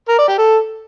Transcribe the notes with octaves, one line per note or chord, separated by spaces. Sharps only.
A#4
D5
G4
A4